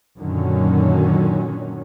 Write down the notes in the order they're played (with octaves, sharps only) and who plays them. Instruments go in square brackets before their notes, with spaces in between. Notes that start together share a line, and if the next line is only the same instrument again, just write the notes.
[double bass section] F#2 A#2 D3 D#3 F#3 C#4